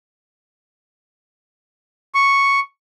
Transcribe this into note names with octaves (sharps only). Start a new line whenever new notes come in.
C#6